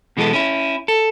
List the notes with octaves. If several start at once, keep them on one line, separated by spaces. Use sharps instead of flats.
B2 E3 G#3 B3 A4
C#4 E4
A4